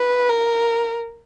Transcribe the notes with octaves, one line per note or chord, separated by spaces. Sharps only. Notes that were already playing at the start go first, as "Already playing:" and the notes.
Already playing: B4
A#4